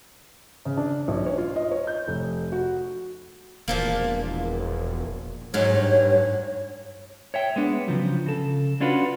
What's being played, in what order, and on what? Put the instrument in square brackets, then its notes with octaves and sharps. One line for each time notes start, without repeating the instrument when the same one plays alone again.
[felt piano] C#3
D4
B1
C#5
F4
D#5
C#5
G6
F1
F#4
[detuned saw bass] E1 [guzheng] A#2 F3 A#3
[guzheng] G#2 F#3 [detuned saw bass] G#3 [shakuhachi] C#5
[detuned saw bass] G2
[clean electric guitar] C#5 E5 G5
G#3 B3 D4
C#3 F3 F#3
C#3 A4
C#4 D4 F4 F#4 B4